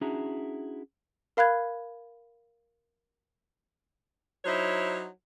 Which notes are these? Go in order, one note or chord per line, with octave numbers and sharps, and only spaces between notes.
C#4 D4 E4 F#4 G#4 A#5
A#4 F5 B5 F#6 G#6
F#3 D#4 E4 C5 C#5